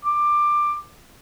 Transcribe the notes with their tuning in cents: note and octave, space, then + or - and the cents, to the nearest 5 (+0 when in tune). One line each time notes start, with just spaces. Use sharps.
D6 +15